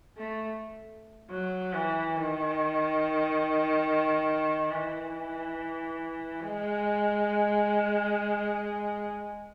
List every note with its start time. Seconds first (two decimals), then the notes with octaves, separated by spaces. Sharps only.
0.17 A3
1.30 F#3
1.73 E3
2.16 D#3
4.71 E3
6.42 G#3